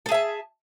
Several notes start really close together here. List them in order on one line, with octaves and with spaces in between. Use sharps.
A4 G#4 E5 A5